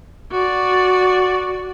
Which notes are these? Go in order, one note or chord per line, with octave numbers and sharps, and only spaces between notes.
F#4 D5